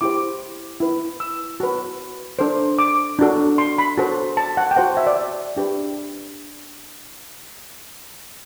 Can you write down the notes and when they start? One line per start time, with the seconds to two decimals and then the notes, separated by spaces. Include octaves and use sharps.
0.01 E4 G4 C5 D6
0.80 E4 B4
1.20 E6
1.60 F#4 B4
2.39 D4 A4 C5
2.79 D6
3.19 D4 F#4 A4
3.58 C6
3.78 B5
3.98 F#4 A4 C5
4.37 A5
4.57 F#5
4.71 G5
4.76 F#4 C5 F#5
4.97 E5
5.07 D5
5.57 D4 G4 B4